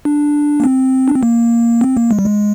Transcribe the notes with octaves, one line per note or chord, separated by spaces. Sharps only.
D4
A#3
C4
D4
C4
A#3
C4
A#3
G#3
G3
G#3